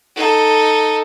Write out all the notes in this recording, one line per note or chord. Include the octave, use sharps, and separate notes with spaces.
D#4 A4